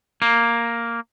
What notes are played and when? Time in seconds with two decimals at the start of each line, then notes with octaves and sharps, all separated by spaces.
0.22 A#3